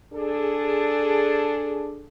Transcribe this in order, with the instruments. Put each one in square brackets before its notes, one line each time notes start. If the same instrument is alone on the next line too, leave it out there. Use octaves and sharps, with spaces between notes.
[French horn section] D4 G#4 A4